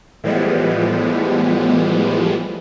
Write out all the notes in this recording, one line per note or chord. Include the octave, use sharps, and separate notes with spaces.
A2 E3 F3 G3 G#3 B3